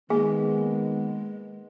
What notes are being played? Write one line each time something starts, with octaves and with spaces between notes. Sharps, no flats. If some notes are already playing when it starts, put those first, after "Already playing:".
D#3 G#3 A#3 B3 G#4